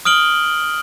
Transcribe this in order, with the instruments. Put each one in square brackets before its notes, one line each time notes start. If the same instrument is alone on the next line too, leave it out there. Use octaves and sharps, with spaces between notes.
[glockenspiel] D#6 F6 D7 F#7 G7